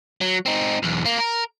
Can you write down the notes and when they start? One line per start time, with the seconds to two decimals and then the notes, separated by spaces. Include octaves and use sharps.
0.21 F#3
0.46 C4 D#4
0.83 B1 E2
1.06 A#3
1.18 A#4